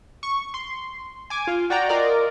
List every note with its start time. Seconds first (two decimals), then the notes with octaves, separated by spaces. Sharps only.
0.23 C#6
0.54 C6
1.30 G#5 D6
1.47 F4
1.70 F#4 D5 G5 A#5
1.88 F4 A#4 D5 D#5